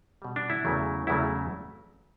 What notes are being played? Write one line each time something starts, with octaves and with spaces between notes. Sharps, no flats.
B2 G3
D4
E4
E2 C#3 F#3 A3
E2 C#3 F#3 A3 E4